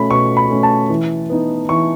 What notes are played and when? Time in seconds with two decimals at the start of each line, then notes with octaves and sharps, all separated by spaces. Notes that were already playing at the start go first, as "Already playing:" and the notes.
Already playing: B2 A3 C#4 B5
0.10 B2 C#6
0.37 B5
0.50 A3 C#4
0.63 A5
0.89 E3
1.30 B3 D#4
1.69 E3 C#6